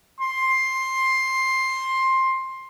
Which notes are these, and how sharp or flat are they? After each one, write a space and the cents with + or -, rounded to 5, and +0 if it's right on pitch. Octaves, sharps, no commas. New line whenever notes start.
C6 +10